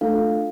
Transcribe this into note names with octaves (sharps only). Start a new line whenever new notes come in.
A3 D4 F4 A4 F5